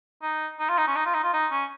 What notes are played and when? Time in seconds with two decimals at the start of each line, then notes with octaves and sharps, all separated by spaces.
0.22 D#4
0.59 D#4
0.69 F4
0.78 D#4
0.87 C#4
0.96 D#4
1.06 F4
1.14 D#4
1.23 F4
1.33 D#4
1.52 C#4